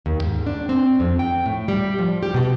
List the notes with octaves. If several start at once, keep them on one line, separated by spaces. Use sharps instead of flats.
D#2
G#2
D4
C4
F2
G5
A2
G3
F3
G4
B2